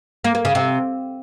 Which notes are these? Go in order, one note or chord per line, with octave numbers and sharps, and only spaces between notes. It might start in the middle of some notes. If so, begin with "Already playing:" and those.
A#3
A#3
C#3
C3